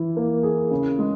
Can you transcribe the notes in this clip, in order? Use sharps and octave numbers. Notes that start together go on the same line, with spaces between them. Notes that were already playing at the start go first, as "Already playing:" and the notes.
Already playing: E3 E4
A#3
G#4
C#3
G#3